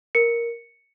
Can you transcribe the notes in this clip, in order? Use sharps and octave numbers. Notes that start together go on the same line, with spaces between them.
A#4 C#7